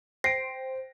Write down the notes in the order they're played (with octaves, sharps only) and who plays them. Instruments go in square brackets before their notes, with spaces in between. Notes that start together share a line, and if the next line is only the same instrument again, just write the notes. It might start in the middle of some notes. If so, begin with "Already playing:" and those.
[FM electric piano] C5 G5 [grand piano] A#6 D7 [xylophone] C7